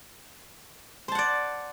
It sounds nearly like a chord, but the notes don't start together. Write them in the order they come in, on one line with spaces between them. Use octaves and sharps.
C5 A5 F#5 D5